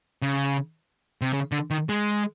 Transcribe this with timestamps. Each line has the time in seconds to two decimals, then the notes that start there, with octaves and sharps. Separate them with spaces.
0.22 C#3
1.22 C3
1.33 C#3
1.52 D3
1.71 D#3
1.89 G#3